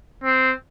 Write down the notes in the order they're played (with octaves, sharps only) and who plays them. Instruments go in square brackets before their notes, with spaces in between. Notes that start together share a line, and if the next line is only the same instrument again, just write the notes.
[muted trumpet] C4